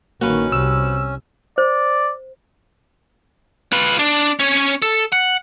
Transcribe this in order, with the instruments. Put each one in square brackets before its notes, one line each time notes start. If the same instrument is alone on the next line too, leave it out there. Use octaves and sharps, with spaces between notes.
[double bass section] A#1 D#3 [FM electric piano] A#3 [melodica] C#4 [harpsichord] F#4 B4
[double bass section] C2 C3 G3 [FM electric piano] E6
[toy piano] C5 [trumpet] D5
[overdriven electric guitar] F4 B4
D4
C#4 C#5
A4
F#5